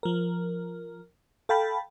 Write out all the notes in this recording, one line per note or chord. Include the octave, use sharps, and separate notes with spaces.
F3 A#4
A4 F5 G5 A5 B5